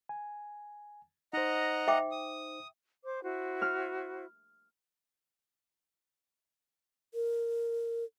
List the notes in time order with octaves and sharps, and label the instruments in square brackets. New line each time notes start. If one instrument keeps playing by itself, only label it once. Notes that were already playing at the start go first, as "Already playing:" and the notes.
[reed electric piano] G#5
[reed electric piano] D#4 C5 [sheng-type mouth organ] D#5 F#5 A#5
[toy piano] E5 G5 D6
[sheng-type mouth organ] D#6
[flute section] C5 D6
E4 F#4 C5
[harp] F6
[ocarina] A#4